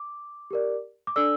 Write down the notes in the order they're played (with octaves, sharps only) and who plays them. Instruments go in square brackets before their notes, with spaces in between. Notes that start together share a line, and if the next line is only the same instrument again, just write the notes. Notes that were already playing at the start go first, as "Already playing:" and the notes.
Already playing: [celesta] D6
G4 A#4 D5
D6
D4 A4 D5 E6